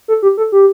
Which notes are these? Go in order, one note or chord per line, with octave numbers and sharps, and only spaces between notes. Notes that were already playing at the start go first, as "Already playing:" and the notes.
A4
G4
A4
G4